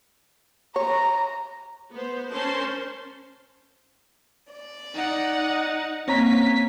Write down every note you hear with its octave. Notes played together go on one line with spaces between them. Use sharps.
C#5 A#5
B3 C5
C#4 A#4 C5 A5 C6
D5
D#4 F#5
A#3 C4 C#4 C#5 A#5 B6